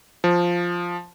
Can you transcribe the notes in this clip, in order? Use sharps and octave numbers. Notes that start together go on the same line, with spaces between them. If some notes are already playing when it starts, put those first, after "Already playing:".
F3